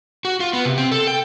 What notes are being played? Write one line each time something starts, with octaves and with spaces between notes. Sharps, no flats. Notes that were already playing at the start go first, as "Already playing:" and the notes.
F#4
F4
B3
C3
C4
A4
G5